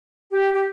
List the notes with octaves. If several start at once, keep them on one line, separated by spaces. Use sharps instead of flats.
G4
G4